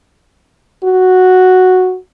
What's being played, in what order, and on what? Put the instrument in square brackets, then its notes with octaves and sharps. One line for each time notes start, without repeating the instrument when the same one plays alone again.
[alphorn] F#4